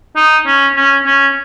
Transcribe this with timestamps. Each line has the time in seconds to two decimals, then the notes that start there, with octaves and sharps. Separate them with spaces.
0.16 D#4
0.46 C#4
0.76 C#4
1.06 C#4